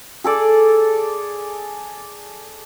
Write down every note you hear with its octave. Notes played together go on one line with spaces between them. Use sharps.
G#4 A4 D5